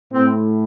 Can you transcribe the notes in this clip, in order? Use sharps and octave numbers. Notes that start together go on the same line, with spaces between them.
A2 C4